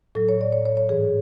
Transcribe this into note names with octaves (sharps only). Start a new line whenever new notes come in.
A2 F#3 A4
C#5
D5
C#5
C#5
C#5
G#2 E3 G#4